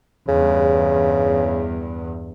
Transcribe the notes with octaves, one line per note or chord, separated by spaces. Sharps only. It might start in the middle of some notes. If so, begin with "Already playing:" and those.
E2 G2 C#3